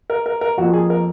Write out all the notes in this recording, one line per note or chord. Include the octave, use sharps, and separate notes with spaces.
A#4
A#4
A#4
F2 F3 A#3 F#4
G#4
A#4